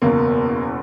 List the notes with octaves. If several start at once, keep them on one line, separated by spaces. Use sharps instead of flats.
F#1 E2 B2 A#3